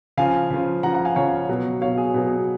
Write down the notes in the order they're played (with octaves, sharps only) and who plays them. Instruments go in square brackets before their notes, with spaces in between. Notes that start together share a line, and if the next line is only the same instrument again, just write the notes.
[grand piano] C#3 F3 F5 G#5
C#3 F3
C#3 F3 F#5 A#5
F#5 A#5
F5 G#5
C#3 F3 C#5 F5
B2 F#3
B2 F#3 C#5 F5
G#4
B2 F#3